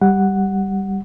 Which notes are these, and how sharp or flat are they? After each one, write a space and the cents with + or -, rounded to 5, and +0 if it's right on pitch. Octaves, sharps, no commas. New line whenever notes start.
G3 +0 F#5 +0